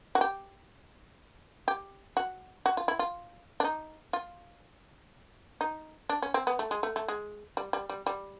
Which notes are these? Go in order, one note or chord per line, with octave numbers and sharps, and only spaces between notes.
F#4
G4
G4
F#4
F#4
F4
E4
F4
D4
D#4
F4
D#4
D4
C#4
C4
B3
A3
G#3
A3
A3
G#3
G3
G3
G3
G3